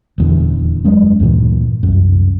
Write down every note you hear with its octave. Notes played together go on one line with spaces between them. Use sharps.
D#1 E2 D3
F#1 F#3 G#3 C#4
D2 G2 A#2 E3
C2 F#2